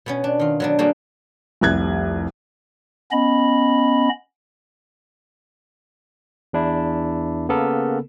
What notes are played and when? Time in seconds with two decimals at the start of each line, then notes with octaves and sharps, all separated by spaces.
0.06 B2 B3 C#4
0.24 D4
0.39 D#3 F4
0.60 F#3 B3 D4
0.79 G3 A#3 D4 F#4 G#4
1.61 F1 C2 F#6 G#6
3.12 B3 C#4 D#5 B5
6.53 E2 D4 E4
7.49 C#3 A#3 B3 A4 A#4